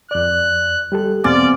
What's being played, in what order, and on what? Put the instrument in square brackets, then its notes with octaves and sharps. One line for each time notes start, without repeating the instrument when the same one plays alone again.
[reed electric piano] F2 D5 [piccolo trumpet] F#6
[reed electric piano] G3 G4 A4
[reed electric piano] E2 B2 G#5 [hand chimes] B3 C4 D6 [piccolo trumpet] D5